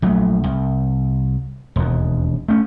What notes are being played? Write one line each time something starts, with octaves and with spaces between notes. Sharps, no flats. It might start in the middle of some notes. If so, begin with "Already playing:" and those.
A#1 F#3 A3
C2
E1 D#2
A3 C#4